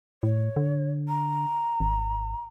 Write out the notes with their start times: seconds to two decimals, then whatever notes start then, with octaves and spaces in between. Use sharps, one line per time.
0.23 A2 C#5
0.56 D3
1.08 A#5
1.80 G#1